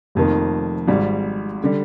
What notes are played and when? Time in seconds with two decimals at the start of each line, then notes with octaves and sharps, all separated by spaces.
0.15 F1 F2 D#3 A#3
0.88 G#1 G#2 G3
1.64 D3 G3